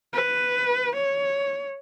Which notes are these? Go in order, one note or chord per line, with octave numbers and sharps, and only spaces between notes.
B4
C#5